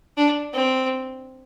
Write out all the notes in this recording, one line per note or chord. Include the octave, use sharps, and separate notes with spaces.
D4
C4